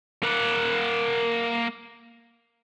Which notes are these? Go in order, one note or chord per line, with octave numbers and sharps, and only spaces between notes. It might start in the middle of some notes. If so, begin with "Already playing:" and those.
A#3 F#5